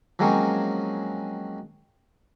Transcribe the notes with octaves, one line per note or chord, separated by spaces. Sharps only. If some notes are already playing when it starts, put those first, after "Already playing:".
F3 F#3 G#3 A#3 C4 C#4